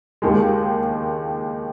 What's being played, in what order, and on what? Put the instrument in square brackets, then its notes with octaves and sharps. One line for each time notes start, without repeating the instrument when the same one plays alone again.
[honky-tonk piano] D#2 D#3 G#3